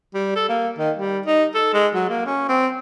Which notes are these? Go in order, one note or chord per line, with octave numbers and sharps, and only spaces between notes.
G3
A4
A#3
D#3
G3
D#4
A4
G#3
F#3
A#3
C#4
C4